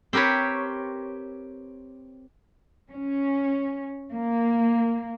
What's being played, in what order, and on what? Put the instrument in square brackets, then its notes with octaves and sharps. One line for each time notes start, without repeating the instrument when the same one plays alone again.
[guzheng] C4 G4 A#4 B4 C#5
[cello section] C#4
A#3